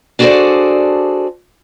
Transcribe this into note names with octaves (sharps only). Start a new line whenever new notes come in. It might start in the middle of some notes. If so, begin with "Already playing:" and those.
D4 F#4 G#4 A4 C5 D5